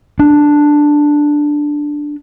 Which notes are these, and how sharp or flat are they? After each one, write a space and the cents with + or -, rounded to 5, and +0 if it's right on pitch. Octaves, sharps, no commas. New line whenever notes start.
D4 +5